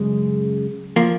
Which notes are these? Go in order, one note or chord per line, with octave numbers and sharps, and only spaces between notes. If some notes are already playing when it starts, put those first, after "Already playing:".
Already playing: F#2 C#3 G#3
F3 A#3